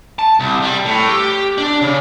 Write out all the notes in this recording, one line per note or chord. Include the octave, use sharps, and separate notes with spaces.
A5
C2
G3
A2
G4
D4
C#3